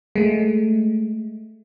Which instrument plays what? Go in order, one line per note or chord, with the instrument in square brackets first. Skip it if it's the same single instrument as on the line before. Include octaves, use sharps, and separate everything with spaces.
[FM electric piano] G#3 A3